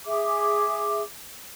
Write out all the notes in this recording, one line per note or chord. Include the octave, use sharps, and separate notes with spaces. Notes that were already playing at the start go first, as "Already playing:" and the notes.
G#4 E5 D6